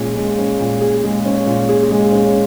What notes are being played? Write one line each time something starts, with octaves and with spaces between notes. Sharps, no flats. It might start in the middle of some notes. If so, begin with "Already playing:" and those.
Already playing: A#2 G#3 C#4 G#4
G#3
C#4
A#2
G#4
G#3
C#4
A#2
G#4
G#3
C#4